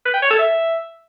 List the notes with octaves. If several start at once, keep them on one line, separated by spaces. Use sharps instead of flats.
B4
G5
C#5
A4
E5